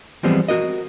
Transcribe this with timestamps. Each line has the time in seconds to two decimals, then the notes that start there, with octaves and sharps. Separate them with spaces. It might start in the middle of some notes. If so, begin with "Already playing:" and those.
0.23 E3 F3 G3 G#3 B3 C4
0.48 F#4 A#4 D#5